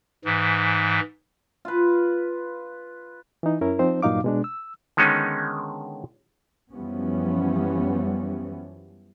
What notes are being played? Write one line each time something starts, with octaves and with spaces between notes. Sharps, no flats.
G#2 E3
F4 B4
E3 D#4
F#2 C#4 E4 A#4
F3 C4 D#4 C5
G2 A#2 F#3 D#4 F5 D6
B2 G#3 D4
E6
D3 D#3 G#3 B3 C#4 D#4
F#2 E3 F3 G3 B3 C#4